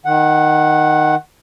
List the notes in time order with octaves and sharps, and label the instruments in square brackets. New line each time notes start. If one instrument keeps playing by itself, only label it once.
[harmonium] D#3 F#5